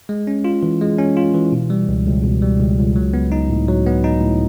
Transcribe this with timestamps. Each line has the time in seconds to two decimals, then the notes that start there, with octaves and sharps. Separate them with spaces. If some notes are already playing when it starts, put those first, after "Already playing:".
0.09 G#3
0.27 C#4
0.44 F4
0.63 E3
0.81 G#3
0.98 C#4
1.17 F4
1.34 E3
1.52 B2
1.70 G3
1.88 C#2
2.07 C#2
2.24 B2
2.42 G3
2.60 C#2
2.79 C#2
2.96 F#3
3.14 B3
3.32 D#4
3.50 A2
3.68 F#3
3.86 B3
4.04 D#4
4.21 A2